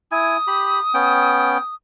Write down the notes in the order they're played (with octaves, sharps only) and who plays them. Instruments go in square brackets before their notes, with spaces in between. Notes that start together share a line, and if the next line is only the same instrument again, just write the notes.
[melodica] E4 G#5 [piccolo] D#6
[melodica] G4 B5
B3 C#4 G5